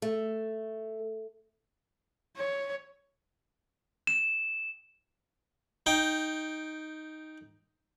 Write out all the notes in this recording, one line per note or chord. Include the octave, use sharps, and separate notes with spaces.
A3
C#5
E7
D#4 G5